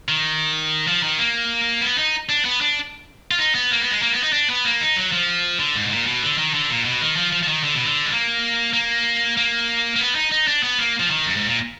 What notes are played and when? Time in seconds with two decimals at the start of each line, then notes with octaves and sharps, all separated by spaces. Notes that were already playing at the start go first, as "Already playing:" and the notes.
0.09 D#3
0.88 F3
1.03 D#3
1.19 A#3
1.81 B3
1.98 D#4
2.29 D4
2.45 B3
2.61 D4
3.31 F4
3.39 D#4
3.55 B3
3.71 A#3
3.81 B3
3.91 G#3
4.02 A#3
4.12 B3
4.23 D#4
4.33 D4
4.50 B3
4.65 A#3
4.81 D#4
4.96 F#3
5.12 F3
5.60 D3
5.75 G#2
5.84 B2
5.91 A#2
6.07 B2
6.22 D3
6.38 D#3
6.54 D3
6.70 A#2
6.85 B2
7.01 D#3
7.17 F3
7.32 F3
7.43 F3
7.48 D#3
7.64 D3
7.75 B2
7.85 D3
8.06 G#3
8.12 A#3
8.73 A#3
9.37 A#3
9.96 A#3
10.00 B3
10.15 D#4
10.32 D#4
10.48 D4
10.63 B3
10.79 A#3
11.00 F3
11.10 D#3
11.26 F#2
11.36 G#2
11.47 A#2